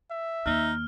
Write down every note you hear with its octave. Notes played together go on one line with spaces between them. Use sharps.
E5
D#2 D#4 F6